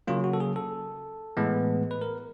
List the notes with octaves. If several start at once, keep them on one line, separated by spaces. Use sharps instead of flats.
C#3 F#3 A#3 F4
F#4
A4
G#4
A4
A2 E3 G#3 B3
B4
A#4